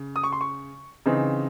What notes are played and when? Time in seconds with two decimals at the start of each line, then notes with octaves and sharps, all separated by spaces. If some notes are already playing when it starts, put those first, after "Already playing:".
Already playing: C#3
0.16 D#6
0.23 C#6
0.33 C6
0.41 C#6
1.06 C#3 E3 C4 D#4